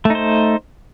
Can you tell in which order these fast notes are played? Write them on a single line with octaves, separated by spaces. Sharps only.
A3 D#4 C5